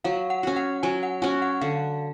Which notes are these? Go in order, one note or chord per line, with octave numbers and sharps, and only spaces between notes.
F#3 F5
F#5
C#4 F#4
F#5
F#3 G#5
F#5
C#4 F#4 G#5
F#5
D3 F5